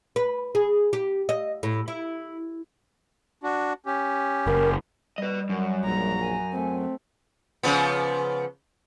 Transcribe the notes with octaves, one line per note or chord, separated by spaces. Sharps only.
B4
G#4
G4
D#5
A2
E4
D4 F#4
C#4 G4
F#1 A#4
G3 B4 D#5
F#2
A#1 A#5
G#5
A3 C4
C#3 F3 B3